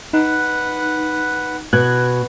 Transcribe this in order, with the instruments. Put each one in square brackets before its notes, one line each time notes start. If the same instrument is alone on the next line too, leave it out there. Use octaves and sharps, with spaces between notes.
[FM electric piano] D#4 [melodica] B4 F#5
[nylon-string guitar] B2 [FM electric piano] F#6 G#6